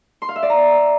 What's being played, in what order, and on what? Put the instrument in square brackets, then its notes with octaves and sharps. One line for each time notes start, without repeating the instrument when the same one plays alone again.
[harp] C6
F5
E5
D5
A#5